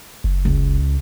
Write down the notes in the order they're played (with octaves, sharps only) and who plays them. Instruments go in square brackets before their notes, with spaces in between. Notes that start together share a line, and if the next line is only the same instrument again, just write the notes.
[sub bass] F#1
[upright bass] C#2